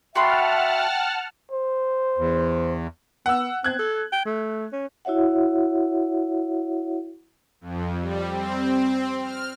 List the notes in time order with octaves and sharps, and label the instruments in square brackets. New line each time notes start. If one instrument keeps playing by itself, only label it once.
[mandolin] F#4 B5 C6 [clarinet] E5 [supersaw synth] F#5 A5 F6 [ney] G5
[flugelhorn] C5
[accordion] E2
[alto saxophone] B3 [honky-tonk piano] F#5 E6
[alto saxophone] C4 [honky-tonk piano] F#6 G#6
[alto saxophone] A4
G5
A3
C#4
[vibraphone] E4 F#4 C#5 E5 F#5
[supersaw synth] F2
G3
C4
F6